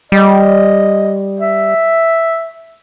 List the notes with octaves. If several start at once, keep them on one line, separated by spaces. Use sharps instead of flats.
G3 D#5
E5